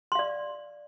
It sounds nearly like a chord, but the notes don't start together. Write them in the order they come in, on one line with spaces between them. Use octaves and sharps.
C6 F5 D5